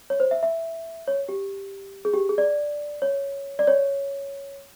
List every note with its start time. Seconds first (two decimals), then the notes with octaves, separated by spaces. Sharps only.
0.10 C#5
0.20 C5
0.31 E5
0.43 E5
1.08 C#5
1.29 G4
2.05 G#4
2.14 G4
2.29 G#4
2.38 D5
3.02 C#5
3.59 D5
3.67 C#5